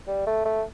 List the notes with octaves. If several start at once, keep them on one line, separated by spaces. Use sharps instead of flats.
G3
A3
A3